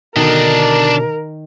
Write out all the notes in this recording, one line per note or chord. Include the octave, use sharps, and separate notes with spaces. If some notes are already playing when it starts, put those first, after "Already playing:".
B2 D3 D#3 D4 A#4 D#5